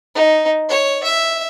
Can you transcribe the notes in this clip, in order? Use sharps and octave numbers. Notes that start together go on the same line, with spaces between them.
D#4
C#5
E5